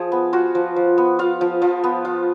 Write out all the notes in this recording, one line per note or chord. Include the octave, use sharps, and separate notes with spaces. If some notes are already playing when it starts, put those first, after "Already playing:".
Already playing: F3 G#4
B3
F4 F#4
F3
F3
B3
F4 F5
F3
F3
B3
F4